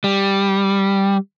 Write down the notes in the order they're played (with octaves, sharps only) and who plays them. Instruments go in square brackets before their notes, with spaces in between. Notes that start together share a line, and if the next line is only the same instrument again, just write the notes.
[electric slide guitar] G3